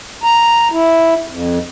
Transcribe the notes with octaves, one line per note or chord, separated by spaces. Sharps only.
A#5
E4
F2